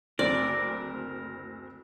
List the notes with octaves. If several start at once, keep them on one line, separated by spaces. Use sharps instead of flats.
F#1 D2 C4 A#4 D5